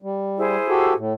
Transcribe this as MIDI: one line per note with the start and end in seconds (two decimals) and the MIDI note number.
0.02 0.56 55
0.38 0.94 64
0.38 0.94 68
0.38 0.94 72
0.69 0.93 66
0.69 0.93 67
0.69 0.93 69
0.96 1.13 45